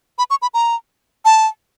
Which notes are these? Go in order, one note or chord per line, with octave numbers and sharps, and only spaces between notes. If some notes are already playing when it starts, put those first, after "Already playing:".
B5
C#6
B5
A#5
A5